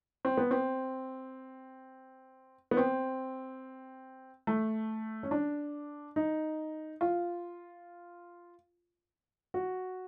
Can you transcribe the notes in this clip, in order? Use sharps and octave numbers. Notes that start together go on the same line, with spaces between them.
C4
B3
C4
B3
C4
A3
C#4
D4
D#4
F4
F#4